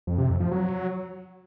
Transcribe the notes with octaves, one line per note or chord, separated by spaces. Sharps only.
F2
C3
F2
F3
F#3